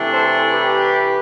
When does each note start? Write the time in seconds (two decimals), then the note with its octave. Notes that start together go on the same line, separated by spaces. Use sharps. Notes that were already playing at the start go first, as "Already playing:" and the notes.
Already playing: C3 E3 A3 D4
0.12 A4 C5
0.52 G4 B4